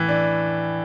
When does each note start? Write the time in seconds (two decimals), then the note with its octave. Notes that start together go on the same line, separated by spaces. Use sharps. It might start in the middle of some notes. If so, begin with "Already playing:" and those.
Already playing: A2 E3
0.08 D4